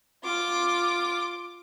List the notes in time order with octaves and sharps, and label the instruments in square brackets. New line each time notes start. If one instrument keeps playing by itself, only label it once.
[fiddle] F4 D6